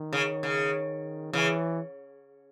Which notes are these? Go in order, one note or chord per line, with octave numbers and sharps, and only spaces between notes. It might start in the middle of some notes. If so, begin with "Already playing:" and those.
Already playing: D#3
C#3
C#3
C#3 E3